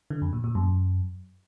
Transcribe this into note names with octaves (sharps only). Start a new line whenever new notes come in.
D3
F2
A#2
A#2
F#2